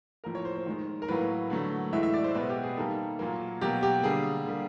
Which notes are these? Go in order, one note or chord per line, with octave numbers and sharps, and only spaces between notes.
A2 F3 A#3 A#4
C#5
C5
C5
D#3 G#3
A#4
A2 F#3 A#3 B4
D3 F#3 A3
A2 E3 G#3 E5
E5
D5
C5
B2 G#3 B4
G4
G#4
D#3 G3 A#3 A4
A#2 F#3 A#3
B2 F#3 A#3 G4
G4
D3 G3 A#3 G#4
D3 G3 A#3